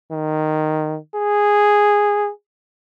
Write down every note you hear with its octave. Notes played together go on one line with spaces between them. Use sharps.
D#3
G#4